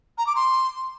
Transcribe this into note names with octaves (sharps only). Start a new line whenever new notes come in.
A#5
D6
C6